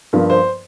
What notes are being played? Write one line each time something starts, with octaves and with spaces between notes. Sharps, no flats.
G2 F3 A#3
C5